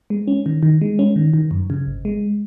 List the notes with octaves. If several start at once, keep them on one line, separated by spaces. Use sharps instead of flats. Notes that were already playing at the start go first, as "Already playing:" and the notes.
G#3
C#4
D#3
D#3
G#3
C#4
D#3
D#3
F#2
C#3
G#1
G#3